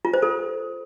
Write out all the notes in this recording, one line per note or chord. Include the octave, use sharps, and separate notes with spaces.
F4
C5
A4